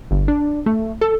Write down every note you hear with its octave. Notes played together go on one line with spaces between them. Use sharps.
G1
D4
A3
A4